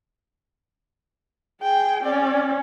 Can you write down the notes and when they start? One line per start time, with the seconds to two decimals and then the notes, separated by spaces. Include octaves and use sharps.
1.62 G#4 G5
2.04 C#4 D5